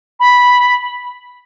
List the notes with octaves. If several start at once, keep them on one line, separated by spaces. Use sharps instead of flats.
B5